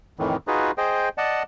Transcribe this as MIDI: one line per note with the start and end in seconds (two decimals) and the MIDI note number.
0.19 0.36 41
0.19 0.36 45
0.19 0.36 51
0.19 0.36 52
0.47 0.71 63
0.47 0.71 65
0.47 0.71 66
0.47 0.71 68
0.47 0.71 71
0.78 1.09 68
0.78 1.09 72
0.78 1.09 75
0.78 1.09 79
1.18 1.43 74
1.18 1.43 75
1.18 1.43 78
1.18 1.43 81